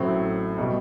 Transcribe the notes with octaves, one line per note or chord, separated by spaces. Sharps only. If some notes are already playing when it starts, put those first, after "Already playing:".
Already playing: A1 A2 F#3 A3 C4
B2 G3